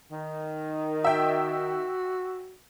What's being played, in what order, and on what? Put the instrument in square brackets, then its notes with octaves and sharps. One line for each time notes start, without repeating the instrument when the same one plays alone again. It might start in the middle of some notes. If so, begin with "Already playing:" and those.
[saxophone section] D#3
[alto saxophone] F#4 [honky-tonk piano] E5 G5